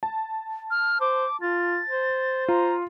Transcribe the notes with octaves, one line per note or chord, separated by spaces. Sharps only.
A5
F6
C5 D6
F4 A6
C5
F4 A#5